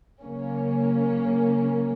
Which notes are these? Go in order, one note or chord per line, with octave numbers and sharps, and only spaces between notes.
C#3 F#3 A#3 C#4